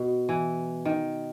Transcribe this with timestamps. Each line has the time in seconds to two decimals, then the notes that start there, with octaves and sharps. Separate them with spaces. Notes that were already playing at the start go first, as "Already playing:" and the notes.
Already playing: B2
0.29 E3
0.85 D#3